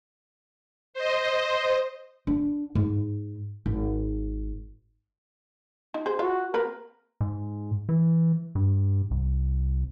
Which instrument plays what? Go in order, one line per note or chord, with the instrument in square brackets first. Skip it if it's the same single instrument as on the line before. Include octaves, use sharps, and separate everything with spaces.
[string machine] C5 D#5
[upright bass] D4
G#2
G#1
[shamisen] F3 D#4
G#4 C5
[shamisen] F4 E5 [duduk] F#4
[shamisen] A#3 C4 B4 [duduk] A#4
[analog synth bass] G#2
E3
G2
C2